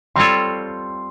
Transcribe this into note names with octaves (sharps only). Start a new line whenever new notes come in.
G3 C4 F4 A4 C#5 C6